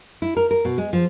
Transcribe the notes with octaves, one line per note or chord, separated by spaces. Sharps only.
E4
A#4
A#4
B2
G#3
F3